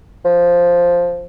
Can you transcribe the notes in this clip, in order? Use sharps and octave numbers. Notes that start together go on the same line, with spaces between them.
F3